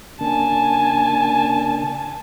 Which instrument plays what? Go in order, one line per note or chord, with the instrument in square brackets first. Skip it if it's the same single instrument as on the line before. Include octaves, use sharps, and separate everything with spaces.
[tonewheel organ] C#3 A#3 D4 [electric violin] G#5 A5